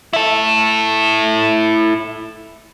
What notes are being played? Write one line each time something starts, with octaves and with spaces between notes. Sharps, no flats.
E4 A4